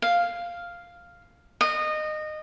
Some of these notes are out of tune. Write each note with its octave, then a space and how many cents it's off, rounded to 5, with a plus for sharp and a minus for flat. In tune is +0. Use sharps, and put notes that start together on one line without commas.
F5 +0
D#5 -20